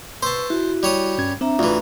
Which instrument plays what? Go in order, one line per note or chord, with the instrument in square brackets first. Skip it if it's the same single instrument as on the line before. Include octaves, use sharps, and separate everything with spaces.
[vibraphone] B4 C#6 E6 [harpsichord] C5 A5 [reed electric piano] C6
[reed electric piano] E4 [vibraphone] F#4
[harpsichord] G3 C#5 D#6
[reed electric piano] G2 C#4 G#6
[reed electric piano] C4 [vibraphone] D4 E5 A#5
[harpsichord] D2 E3 [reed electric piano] F4